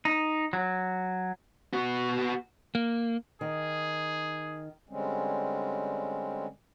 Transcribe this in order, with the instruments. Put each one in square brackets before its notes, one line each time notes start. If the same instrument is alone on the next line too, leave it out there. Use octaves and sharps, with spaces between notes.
[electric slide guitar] D#4
F#3
[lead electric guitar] B3 F#4
[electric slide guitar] A#3
[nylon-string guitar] D#3 [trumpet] G#4
[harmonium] D3 G3 G#3 C4 C#4